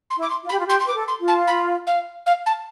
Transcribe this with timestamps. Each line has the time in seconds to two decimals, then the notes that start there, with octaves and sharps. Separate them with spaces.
0.10 C6
0.17 E4
0.22 D6
0.29 C6
0.43 F4
0.49 B5
0.51 G4
0.59 F4
0.68 G4 C6
0.79 C6
0.86 B4 D6
0.95 A4
1.07 C6
1.20 F4
1.27 A5
1.47 B5
1.86 F5
2.26 F5
2.45 A5